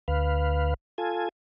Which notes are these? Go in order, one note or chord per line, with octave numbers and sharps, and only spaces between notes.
D2 B4 F5
F4 A4 G#5